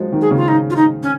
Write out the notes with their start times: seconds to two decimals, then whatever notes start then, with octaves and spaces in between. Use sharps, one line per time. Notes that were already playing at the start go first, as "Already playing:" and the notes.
Already playing: F3 F#3 G#3
0.13 D#3
0.21 G#4
0.31 C#3
0.37 F4
0.48 D#4
0.70 F4
0.76 D#4
1.03 C#4